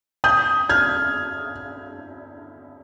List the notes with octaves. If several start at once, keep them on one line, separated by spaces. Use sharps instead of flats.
D#6 G6
F6 G#6